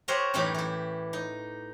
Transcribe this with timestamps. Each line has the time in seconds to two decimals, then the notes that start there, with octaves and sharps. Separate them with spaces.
0.08 G4 A#4 C5 C#5 D#5 F#5
0.34 F#2 A2 E3 D#4 G4 B5
0.54 E3 E4
1.13 D#4